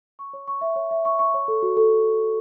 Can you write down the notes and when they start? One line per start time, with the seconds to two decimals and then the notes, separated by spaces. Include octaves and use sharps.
0.19 C#6
0.33 C#5
0.48 C#6
0.61 E5
0.76 C#5
0.91 E5
1.05 C#6
1.19 C#6
1.34 C#5
1.48 A4
1.63 F#4
1.77 A4